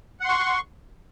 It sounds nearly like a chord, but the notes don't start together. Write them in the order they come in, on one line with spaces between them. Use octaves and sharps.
F#5 C6 C#6